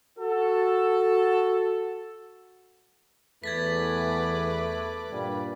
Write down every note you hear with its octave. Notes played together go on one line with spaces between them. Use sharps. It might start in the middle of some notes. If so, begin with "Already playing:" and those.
F#4 A4
E2 A3 B4 D6 G#6 A6 B6
G2 A#2 G3